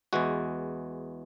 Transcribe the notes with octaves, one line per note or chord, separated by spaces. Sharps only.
E2 E3 G#3 F#4